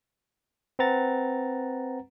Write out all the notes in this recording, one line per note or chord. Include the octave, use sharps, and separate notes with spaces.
C4 B4 F#5 A#5 A6